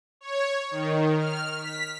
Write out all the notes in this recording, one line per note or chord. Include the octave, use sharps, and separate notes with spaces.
C#5
D#3
F6
B6